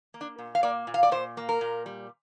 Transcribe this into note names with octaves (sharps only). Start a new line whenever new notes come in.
A#3
D4
A#2
F5
A#3 D5
A#2
F5
D5
A#2 C5
A#3
A#4
A#2
G3